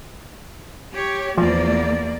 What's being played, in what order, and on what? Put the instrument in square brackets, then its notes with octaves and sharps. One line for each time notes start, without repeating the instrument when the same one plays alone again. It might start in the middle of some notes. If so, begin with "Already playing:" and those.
[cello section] G4 C#5
[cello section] E2 A#3 D5 [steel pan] F3